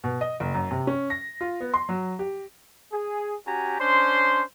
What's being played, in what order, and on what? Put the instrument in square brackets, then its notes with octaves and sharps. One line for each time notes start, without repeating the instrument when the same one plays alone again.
[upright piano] B2
D#5
F#1
F#2
C3
C#4
A#6
F4
B3
C6
F#3
G4
[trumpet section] G#4
C#4 F#4 G4 G#5 A#5
C#4 D4 C5 C6